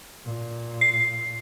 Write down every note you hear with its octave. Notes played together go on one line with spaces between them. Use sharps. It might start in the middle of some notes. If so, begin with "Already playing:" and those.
A#2
C7